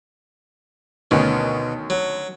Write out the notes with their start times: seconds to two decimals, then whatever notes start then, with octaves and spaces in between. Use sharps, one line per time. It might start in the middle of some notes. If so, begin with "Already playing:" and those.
1.11 D2 B2 D#3 C#4
1.90 F#3